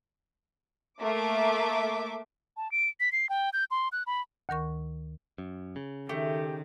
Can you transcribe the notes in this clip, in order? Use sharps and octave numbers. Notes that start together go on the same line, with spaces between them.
A3 A#3 E5 D6
A5
D7
B6
C7
G5
G6
C6
F#6
B5
D2 D#3 A#4 C#6
F#2
C#3
D#3 A3 G4